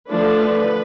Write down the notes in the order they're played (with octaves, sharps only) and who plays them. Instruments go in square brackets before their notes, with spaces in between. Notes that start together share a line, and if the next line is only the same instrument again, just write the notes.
[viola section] D3 F3 A3 D4 B4